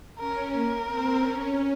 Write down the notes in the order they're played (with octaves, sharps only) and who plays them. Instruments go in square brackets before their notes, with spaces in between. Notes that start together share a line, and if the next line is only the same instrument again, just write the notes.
[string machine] C#4 [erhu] A#4
[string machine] A#3 [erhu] A#4
[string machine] C4
C#4